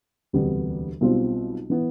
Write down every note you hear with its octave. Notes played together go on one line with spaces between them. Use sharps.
E1 D2 C3 G3 B3
B1 B2 G3 C4 F4
E3 B3